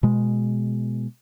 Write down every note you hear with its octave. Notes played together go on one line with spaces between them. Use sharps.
B2 G#3